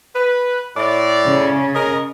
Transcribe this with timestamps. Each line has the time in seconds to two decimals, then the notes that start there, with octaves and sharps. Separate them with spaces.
0.15 B4
0.77 A2 D5
1.27 C#3 C#4
1.75 G#4 A#4 D#5